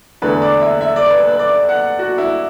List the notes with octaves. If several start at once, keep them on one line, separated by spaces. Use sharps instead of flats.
E2 D3 A3 B4
D5
E5
E5
D5
B4
B4
D5
F#5
F#4
E4